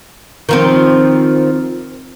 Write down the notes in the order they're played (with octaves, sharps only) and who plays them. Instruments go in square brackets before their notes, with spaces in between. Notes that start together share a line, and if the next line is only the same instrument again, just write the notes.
[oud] D#3 F3 C4